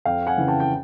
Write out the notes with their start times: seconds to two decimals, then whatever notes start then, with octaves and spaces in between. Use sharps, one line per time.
0.05 F2 F5 G5
0.27 F#5 G#5
0.38 C#3 E3
0.48 G5 A5
0.60 G5